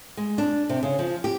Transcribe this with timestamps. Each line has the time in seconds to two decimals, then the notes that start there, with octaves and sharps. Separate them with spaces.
0.17 G#3
0.38 D4
0.69 C3
0.83 C#3
0.99 F3
1.24 G4